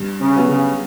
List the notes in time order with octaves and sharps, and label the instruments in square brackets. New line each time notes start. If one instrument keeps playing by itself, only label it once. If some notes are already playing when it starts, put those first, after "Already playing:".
Already playing: [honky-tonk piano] G2
[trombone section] C#3
[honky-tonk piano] F#3 B3
[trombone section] C#3